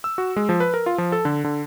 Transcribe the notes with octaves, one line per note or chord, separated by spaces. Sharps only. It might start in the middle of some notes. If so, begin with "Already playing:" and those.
E6
F#4
G#3
F3
B4
A#4
F4
F3
A4
D3
D3